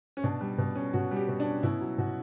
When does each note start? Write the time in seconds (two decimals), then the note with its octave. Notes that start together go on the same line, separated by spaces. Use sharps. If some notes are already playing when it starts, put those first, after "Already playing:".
0.17 C#4
0.23 B2 D4
0.41 G3
0.58 B2
0.75 C#4
0.93 B2 F#4
1.11 G3
1.16 G4
1.28 B2
1.40 D4
1.45 C#4
1.63 B2 E4
1.81 F#3
1.98 B2 F#4